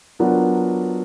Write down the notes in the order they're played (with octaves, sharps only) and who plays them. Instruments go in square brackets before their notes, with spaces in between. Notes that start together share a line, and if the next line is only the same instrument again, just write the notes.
[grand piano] F#3 B3 D4 F4 A#4